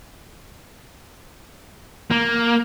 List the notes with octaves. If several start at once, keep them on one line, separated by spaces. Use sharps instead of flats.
A#3